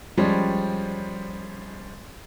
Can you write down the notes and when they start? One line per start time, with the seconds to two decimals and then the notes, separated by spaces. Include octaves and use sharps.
0.17 F3 G3 G#3 C#4